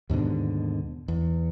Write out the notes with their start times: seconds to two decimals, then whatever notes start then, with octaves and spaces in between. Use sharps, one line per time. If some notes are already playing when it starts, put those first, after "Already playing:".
0.10 D#2 G#2 B2 D3
1.08 E2